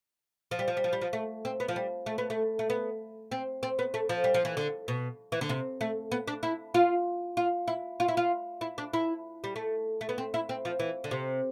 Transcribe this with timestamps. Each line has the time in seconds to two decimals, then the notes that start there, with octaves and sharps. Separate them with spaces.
0.51 F3
0.59 G3
0.68 F3
0.77 G3
0.84 F3
0.93 G3
1.01 F3
1.13 A3
1.45 C4
1.60 B3
1.68 F3
1.76 G3
2.06 A3
2.18 B3
2.30 A3
2.59 A3
2.70 B3
3.31 C4
3.63 C4
3.79 B3
3.94 A3
4.09 F3
4.24 G3
4.34 F3
4.45 E3
4.57 D3
4.88 B2
5.32 E3
5.41 D3
5.49 C3
5.81 A3
6.12 B3
6.28 D4
6.43 E4
6.74 F4
7.37 F4
7.68 E4
8.00 F4
8.08 E4
8.17 F4
8.61 E4
8.78 D4
8.93 E4
9.44 G3
9.56 A3
10.01 A3
10.09 B3
10.18 C4
10.34 E4
10.49 C4
10.65 F3
10.79 E3
11.04 D3
11.11 C3